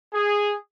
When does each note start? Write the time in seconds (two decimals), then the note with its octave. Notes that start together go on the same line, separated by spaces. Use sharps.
0.14 G#4